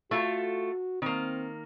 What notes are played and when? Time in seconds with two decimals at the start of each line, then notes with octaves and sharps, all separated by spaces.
0.11 A3 F4 F#4 A4
1.02 D#3 A#3 C4